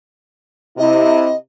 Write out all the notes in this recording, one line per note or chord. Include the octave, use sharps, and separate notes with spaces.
C3 E4 D#5